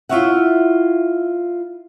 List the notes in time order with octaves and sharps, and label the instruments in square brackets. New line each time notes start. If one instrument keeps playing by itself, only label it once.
[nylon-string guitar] E4 F4 G#4 C#5 E5 F#5